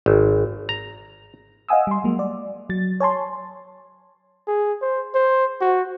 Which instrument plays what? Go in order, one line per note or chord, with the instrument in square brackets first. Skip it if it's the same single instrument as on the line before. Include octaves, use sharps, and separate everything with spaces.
[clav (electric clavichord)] G#1
A#5
[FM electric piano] D#5 F5 F#5 G#5 D#6 E6
G3 C6
F#3 G#3 A#3
D5
F#3 A6
C#5 G#5 A5 C6
[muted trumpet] G#4
C5
C5
F#4